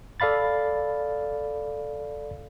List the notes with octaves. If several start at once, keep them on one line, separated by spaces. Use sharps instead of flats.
A4 D5 F5 B5 A6